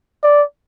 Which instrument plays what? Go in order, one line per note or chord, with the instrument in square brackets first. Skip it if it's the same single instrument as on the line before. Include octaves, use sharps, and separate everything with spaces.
[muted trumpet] D5